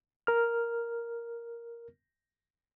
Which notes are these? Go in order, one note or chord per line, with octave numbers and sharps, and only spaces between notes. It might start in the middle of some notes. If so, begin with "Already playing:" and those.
A#4 F6